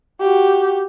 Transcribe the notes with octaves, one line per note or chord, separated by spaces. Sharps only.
F#4 G4